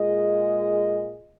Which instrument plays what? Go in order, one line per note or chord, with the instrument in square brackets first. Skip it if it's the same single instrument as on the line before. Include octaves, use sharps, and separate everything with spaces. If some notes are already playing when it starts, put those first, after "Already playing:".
Already playing: [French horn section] A#2 G#3 F4 G#4 D#5